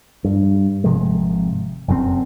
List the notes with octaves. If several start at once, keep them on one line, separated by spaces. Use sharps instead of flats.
G2
G#1 C3 F3 G#3
F1 F#2 B2 C4